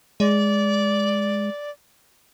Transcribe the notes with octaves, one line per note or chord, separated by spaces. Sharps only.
G#3 D5